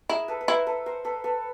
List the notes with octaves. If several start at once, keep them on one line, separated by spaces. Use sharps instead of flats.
E4 G#4 A#4
A4 B4
B4
E4 A#4 C5
A4 B4
A#4 C5
A4 B4
A4 B4